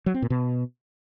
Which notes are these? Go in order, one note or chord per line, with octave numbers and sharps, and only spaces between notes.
F#3
C4
A#2
B2